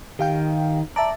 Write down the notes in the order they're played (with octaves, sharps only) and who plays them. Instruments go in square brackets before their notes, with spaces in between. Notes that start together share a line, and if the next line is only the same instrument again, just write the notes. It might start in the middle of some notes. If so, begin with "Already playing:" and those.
[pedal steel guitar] D#3 [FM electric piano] G4 F5 G5
[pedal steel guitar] D5 [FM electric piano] E5 A5 A#5